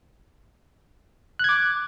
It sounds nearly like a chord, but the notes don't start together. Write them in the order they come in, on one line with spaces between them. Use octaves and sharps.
F#6 G#6 D6